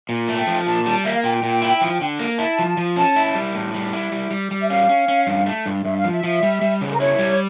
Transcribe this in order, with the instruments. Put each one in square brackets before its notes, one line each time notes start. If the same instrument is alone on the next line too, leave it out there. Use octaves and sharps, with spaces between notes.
[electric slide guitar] A#2
A3
[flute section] G5
[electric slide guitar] F3
[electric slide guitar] A#2 [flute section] A5
[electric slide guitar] G3
[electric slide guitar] A#3 [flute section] E5
[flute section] F5
[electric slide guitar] A#2 [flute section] G5
[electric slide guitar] A#2
E4
F3
D3
A#3
[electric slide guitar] E4 [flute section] A5
[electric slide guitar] F3
F3
[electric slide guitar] C#4 [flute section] A5
[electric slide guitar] E4
G3
A2
G3
E4
G3
G3
G3
[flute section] E5
[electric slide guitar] C#4 [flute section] F5
[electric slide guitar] C#4
C#4
G2
A3
G2
[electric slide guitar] G2 [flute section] E5
[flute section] F5
[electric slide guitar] F3
[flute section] E5
[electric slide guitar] F3
G3
G3
C#3
[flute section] A#4
[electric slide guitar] E4 [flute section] C#5
[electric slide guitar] G3